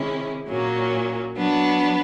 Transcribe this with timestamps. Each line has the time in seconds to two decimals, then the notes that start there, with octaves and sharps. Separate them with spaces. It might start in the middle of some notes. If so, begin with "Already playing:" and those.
Already playing: C3 D#3 G#3 C#4 E4
0.47 A#2 F#3 A#3 C#4
1.36 F#3 B3 D4